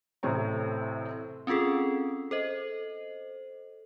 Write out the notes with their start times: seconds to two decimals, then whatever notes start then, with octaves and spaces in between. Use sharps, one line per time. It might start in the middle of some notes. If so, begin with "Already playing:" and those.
0.23 A1 A2 C3 C4 C#5 A#5
1.47 C4 C#4 F4 G#4 A4
2.31 A4 C5 D#5